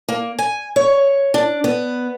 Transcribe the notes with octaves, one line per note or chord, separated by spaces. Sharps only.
A#3
G#5
C#5
D4
B3